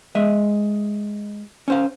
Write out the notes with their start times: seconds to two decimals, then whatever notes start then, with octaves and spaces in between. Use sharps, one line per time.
0.15 G#3 D#5 E5
1.68 C#4 C5 F5